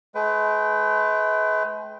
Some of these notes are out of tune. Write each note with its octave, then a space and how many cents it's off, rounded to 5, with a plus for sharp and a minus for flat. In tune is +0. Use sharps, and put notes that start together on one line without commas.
G#3 +45 B4 +30 G5 -10